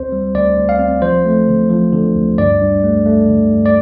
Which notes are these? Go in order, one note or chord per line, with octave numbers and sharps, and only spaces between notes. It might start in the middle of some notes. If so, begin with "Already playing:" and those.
Already playing: D2 C4 C5
G3
D2 D5
D2
F5
C4
F3 C5
A3
D3
F3
D3
D2
G2 D5
G2
A3
A3
D3
G2
D5